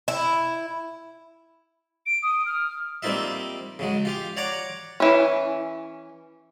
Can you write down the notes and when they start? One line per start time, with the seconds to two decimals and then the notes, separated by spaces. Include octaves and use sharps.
0.08 E4
2.06 D7
2.23 D#6
2.46 F6
3.03 G3 A#3 C4 D#4 F4 E5
3.79 C#3 F#3 G#3
4.05 F4 G4 F5
4.37 C#5 D5 F5 F#5 A#5 D6
5.00 E3 C#4